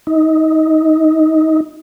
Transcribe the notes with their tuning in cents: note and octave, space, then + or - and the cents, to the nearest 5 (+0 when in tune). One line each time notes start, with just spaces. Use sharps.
D#4 +25